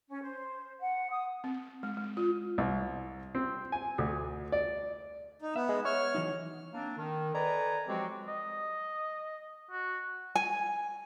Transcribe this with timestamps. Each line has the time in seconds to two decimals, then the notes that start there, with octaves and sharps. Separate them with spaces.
0.09 C#4
0.22 C5
0.80 F#5
1.11 D#6
1.44 C4
1.83 G#3
1.97 G#3
2.17 F4
2.58 C2
3.35 C4
3.72 G#5
3.98 D2
4.52 D5
5.42 D#4
5.56 B3 E5
5.69 G#3
5.85 C#5 F6
6.15 E3 F#3 D#4
6.73 A#3 C4 D4
6.98 D#3
7.34 A4 B4 D5 D#5 G#5 A#5
7.88 F3 F#3 G#3 C4 F#4 G4
8.28 D#5
9.72 F#4
10.35 G#5